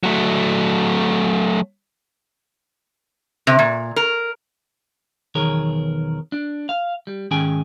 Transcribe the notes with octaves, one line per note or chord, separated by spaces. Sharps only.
F#3 A3
C3
A#2
A#4
B1 E2 D#3 G#4 A#4 C#5
D4
F5
G3
G#2 D#3 C#4 G#4 G5 G#5